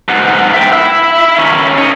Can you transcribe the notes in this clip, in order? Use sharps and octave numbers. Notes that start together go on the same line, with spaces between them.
G#2 B3
E5 G5
E4 E5
D#3 C#4
C#5 D#5